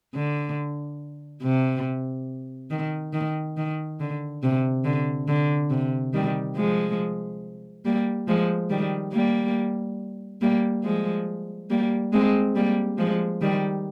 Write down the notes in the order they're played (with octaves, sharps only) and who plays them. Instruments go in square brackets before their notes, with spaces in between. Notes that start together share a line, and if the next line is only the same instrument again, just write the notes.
[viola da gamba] D3
C3
D#3
D#3
D#3
D3
C3
D3
D3
C3
D#3 G3
F3 G#3
G3 A#3
F3 G#3
D#3 G3
G3 A#3
G3 A#3
F3 G#3
G3 A#3
G#3 C4
G3 A#3
F3 G#3
D#3 G3